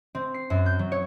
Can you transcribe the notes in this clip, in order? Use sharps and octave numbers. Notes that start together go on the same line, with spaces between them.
C4
C7
F#2
G6
F#3
C#5